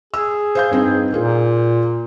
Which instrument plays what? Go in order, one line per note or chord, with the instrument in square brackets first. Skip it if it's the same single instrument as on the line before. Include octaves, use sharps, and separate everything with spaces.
[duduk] G#4 [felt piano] E6
[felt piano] C5 F5 G6
G2 C4 D#4
[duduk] A#2 [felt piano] A#3 F4 G#4